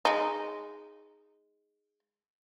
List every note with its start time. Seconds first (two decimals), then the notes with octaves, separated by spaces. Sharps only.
0.05 G#3 D#4